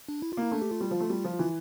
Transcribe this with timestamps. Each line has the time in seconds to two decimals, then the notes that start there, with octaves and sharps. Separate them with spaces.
0.09 D4
0.22 E4
0.33 F4
0.37 A#3
0.42 E4
0.51 A3 D4
0.61 G4
0.71 F4
0.81 G3
0.91 F3
1.00 A3
1.10 G3
1.24 F3
1.39 E3 F4